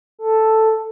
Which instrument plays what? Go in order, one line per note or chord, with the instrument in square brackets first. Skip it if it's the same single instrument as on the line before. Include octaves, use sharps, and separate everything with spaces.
[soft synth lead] A4